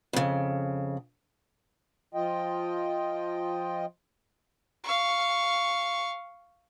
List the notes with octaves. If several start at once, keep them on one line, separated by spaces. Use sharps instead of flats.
F2 C#3
F3 F4 D#5 G5
F5 C#6